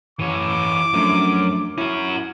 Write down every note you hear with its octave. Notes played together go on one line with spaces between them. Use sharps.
F#2 E3 C#5 D6
F#2 F3 A3 D4
C#4 E4 F#4